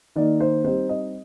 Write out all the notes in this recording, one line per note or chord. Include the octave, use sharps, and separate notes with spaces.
D#3 A#3 D#4 D5
C5
G3 C4 D#4 C5
D#5